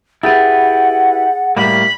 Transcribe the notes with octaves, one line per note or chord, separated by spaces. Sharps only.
E4 G4 G#4 B4 F#5 D#6 A6
A2 G3 A#3 B5